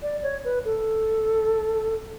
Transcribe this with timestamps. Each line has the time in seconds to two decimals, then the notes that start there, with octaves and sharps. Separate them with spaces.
0.02 D5
0.23 C#5
0.44 B4
0.64 A4